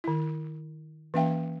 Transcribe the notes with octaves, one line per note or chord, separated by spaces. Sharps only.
D#3 E4
E3 A#3 C#4 E5 F5 G5